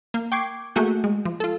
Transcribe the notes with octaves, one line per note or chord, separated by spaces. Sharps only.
A#3
G5 C#6 D6 G#6 C7
A3 A#3 F#4 G#4 G6
G#3
F3
F4 A4